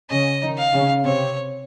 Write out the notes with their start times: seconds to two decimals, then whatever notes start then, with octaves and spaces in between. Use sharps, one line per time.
0.10 C#3 C#4 D#5
0.42 D#3 D#4
0.58 F5
0.73 C#3 C#4
1.04 C3 C4 C#5